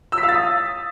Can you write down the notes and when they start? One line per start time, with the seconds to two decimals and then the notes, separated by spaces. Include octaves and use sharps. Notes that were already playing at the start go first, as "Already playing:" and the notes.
0.12 E6
0.18 B6
0.23 F5
0.29 A6
0.34 D#6